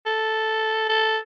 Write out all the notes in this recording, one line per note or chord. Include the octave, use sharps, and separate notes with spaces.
A4
A4